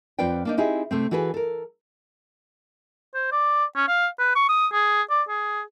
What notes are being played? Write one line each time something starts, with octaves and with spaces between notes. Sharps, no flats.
F2 C4 F4 B4 D5 G5
A#3 D4 D#4
C4 D#4 E4 G4 G#4
C3 A3 C4
E3 F#4 G#4 A4 B4
A4 A#4
C5
D5
C#4
F5
B4
C#6
D#6
G#4
D5
G#4